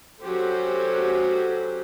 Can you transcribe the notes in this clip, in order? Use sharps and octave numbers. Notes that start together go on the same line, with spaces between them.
F#3 C#4 F#4 G4 A4 C5